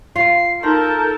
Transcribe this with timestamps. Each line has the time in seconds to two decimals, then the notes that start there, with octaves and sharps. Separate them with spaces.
0.16 F4 C7
0.63 D#4 A4 A#4 F5 A5 C6 G6